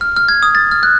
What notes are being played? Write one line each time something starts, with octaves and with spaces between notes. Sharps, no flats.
F6
F6
G#6
D#6
A6
F6
F#6